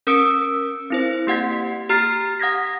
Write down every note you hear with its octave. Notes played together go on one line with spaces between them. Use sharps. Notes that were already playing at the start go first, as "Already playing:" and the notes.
C#4 A#4 D#6 E6 C#7 D7
C4 E4 C5
A#3 G4 F#5 G#6 B6
G4 A#5 F6 A6 C7
F#5 D#6 G#6 A#6 B6